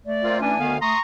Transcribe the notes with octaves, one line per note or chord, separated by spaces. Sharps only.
A3 D5
A#3 C4 F4
E3 C#4 D4 G#5
D2 D3 D#3 B3 F5
A3 A#5 C6 C#6 D#6